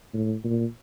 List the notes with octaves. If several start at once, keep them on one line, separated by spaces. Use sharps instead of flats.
A2
A#2